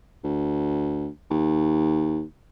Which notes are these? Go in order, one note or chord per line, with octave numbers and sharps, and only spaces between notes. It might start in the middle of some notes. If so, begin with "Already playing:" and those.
D2
D#2